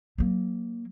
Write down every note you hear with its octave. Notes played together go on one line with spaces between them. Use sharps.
F#3 A#3